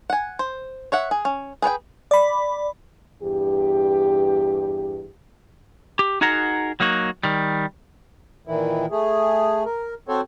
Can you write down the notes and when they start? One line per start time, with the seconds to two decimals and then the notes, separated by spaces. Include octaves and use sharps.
0.10 F#5 G#5
0.39 C5
0.92 C#5 E5 F#5
1.11 G#4
1.25 C#4
1.62 G#4 B4 C#5 G5
2.11 D5 B5
3.22 E2 G2 G4
5.99 G4
6.21 D#4 F#4 G#4 A#4 F#5 A#5
6.80 F#3 A#3 D#4 F#4
7.24 D#3 G3
8.47 A#2 D#3 E3 E4
8.91 A3 G#4
9.65 A#4
10.08 C4 F#4 A4 C5 C#5